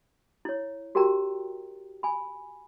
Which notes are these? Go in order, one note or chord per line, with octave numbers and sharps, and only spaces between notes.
E4 C#5
F#4 G4 A#4 G5 A#5
G#5 B5